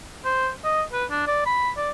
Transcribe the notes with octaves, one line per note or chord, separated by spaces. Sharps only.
C5
D#5
B4
D4
D5
B5
D5